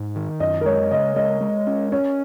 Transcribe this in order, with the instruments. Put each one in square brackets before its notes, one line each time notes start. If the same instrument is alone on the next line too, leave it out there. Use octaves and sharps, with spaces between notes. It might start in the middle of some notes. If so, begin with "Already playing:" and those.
Already playing: [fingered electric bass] G#2
D#3
[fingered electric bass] F#2 [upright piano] D#5
[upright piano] A#4
[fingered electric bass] G#3 [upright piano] C#5
[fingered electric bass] C#3 [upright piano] D#5
[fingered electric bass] G#3 [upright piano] D#5
[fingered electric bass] G#3
C#4
[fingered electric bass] C#4 [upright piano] C#5